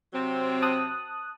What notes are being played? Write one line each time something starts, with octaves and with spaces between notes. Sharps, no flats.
C3 F#3 C4
A5 D#6 F#6